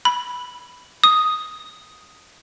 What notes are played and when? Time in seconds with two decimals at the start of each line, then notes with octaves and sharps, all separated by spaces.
0.05 B5
1.04 D#6